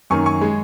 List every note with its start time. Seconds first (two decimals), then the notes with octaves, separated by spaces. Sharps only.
0.10 F#2 D#3 A#3 G#5 C#6
0.26 G#5 C#6
0.41 G#3